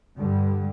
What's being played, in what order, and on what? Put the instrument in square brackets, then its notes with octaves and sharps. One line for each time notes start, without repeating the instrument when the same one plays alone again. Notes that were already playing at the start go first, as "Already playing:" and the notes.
[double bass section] G2 D3 G3